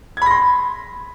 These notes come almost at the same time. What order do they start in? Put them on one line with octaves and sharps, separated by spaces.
G#6 B5 A#6 C6